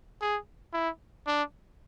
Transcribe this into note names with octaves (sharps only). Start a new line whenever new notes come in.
G#4
E4
D4